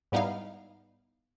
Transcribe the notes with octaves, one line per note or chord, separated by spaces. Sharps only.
G#2 G3 B3 D#4 E4 F5